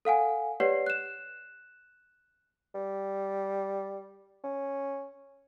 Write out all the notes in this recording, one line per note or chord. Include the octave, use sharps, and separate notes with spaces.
A4 F5 F#5 G#5
G4 B4 C#5 D5 F#5 C7
F#6 E7
G3
C#4